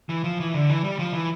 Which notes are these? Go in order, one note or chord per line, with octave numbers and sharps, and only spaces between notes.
E3
F3
E3
D3
E3
G3
F3
E3